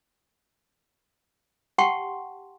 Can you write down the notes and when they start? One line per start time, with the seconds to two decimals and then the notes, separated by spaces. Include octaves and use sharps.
1.78 G4 F#5 G5 A5 C6 C#6